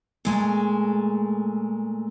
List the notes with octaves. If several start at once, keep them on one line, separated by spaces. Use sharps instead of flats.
A#2 G#3 A3